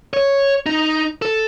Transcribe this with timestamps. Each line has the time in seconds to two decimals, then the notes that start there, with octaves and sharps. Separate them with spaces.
0.13 C#5
0.66 D#4
1.22 A4